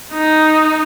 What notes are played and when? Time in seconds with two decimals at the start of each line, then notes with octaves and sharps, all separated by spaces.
0.13 D#4